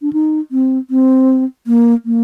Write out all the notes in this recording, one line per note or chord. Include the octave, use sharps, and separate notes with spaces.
D4
D#4
C4
C4
A#3
A#3